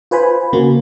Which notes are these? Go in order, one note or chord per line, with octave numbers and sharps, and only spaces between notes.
F4 B4 C5 G#5 B5
C#3 A#3 F#4